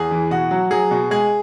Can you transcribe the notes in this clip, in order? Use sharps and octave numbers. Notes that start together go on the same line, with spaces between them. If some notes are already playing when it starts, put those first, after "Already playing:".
Already playing: E2 G#4
E3
B2 F#4
F#3
F#3 G#4
B2
G#3 G#4